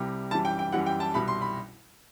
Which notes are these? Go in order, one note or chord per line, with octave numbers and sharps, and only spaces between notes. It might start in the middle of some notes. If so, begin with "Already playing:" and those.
Already playing: C2 C3 G3
F#2 E3 G3 A5
G5
G5
F#2 E3 G3 F#5
G5
A5
C2 B2 G3 B5
C6
B5